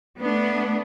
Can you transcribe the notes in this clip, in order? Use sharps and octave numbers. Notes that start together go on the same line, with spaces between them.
A3 B3 D4